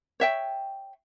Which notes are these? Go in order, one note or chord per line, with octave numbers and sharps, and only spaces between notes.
C#5 E5 G5